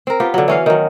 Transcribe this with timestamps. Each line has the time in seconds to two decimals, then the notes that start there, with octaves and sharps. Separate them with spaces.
0.07 C4 A#4
0.20 B3 F4 G4
0.34 D3 F#3
0.48 E3 C#4 F5
0.66 D#3 F#3